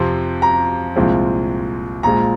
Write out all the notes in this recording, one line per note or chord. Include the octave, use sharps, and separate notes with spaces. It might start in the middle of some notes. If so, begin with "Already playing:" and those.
Already playing: F2 C3 F3 C4
A#5
C2 A#2 F3 G#3 C4
A#1 A#2 G#3 A#5